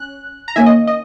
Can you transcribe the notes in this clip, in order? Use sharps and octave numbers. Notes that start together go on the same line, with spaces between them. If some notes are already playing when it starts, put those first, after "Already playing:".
Already playing: C#4 F#6
A#5
D#3 A#3 C#4 E5 G#5
D#5
D#5